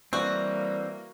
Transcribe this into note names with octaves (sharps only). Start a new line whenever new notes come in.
E3 G3 A#3 C4 F#4